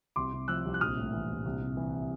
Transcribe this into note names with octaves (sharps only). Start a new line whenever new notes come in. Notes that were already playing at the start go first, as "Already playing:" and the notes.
C2 C6 D6
C3
F3 E6 F#6
C2
F#6
A#1 D#6 F6
A2
E3
A#1
C2
C3
E3